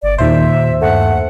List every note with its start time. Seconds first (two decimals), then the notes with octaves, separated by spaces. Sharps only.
0.03 G1 D5
0.18 D#2 A#2 C5 E5
0.81 G2 A3 F#5